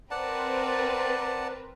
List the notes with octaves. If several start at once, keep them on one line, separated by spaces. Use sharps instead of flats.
C4 A#4 B4 D5 F#5 A5